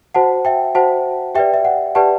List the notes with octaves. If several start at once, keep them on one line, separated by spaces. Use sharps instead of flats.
F#4 C5 F#5 A5
E5 G5
F#4 C5 F#5 A5
G4 B4 D5 E5 G5
E5
F#5
G4 B4 D5 F#5 A5